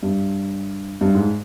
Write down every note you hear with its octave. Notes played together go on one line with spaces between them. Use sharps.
G2
G2
G#2